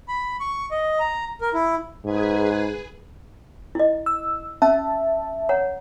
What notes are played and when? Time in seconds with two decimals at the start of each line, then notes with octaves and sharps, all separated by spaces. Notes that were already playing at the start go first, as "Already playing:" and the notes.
0.08 B5
0.40 C#6
0.71 D#5
0.99 A#5
1.41 A#4
1.54 E4
2.05 G#2 G#4 B4 G#5
3.75 E4 D#5
4.06 E6
4.62 C#4 E5 A5
5.49 C#5 F#5 A#5